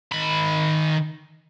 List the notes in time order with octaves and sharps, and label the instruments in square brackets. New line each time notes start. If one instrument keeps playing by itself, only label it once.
[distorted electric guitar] D#3 B5